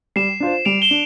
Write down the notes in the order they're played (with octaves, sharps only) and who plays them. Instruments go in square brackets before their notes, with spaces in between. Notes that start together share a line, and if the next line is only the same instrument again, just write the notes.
[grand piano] G3 [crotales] C7 E7
[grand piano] D4 F4 C5
[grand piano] G3 [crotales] D7 F7
[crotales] E7 G7
[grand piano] D4